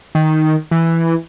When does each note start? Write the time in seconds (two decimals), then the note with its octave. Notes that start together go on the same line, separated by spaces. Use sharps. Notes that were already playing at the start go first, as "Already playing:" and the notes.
0.15 D#3
0.71 E3